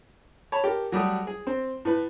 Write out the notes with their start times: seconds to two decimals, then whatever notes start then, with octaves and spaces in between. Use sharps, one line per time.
0.52 C#5 A5 B5
0.64 G4 A4 A#4
0.92 F#3 G3 A3 D#6
1.27 G#4
1.47 C4
1.85 A2 B4